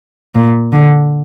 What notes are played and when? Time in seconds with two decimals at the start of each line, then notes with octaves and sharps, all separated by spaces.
0.35 A#2
0.73 D3